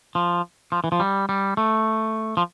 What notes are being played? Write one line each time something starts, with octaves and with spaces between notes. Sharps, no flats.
F3
F3
E3
F3
G3
G3
A3
F3